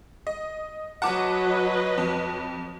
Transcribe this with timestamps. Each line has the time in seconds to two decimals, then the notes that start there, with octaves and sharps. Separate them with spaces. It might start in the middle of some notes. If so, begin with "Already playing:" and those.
0.27 D#5
1.02 F#3 B4 D#5 F#5 A5 D6
1.98 F2